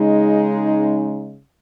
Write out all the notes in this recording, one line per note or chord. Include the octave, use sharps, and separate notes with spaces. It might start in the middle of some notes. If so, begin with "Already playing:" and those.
Already playing: C#3 G#3 D#4